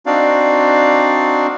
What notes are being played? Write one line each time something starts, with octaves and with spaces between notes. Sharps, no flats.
C4 D4 D#4 F#4 D5 F5